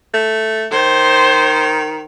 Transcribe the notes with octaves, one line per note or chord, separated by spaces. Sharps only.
A3
D#3 C5